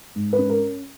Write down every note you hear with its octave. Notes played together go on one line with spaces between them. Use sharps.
G#2
B4
C#4
A#4